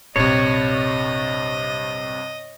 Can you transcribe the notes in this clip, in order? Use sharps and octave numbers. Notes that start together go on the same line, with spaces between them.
A#1 G2 C3 F#3 C#5 D#5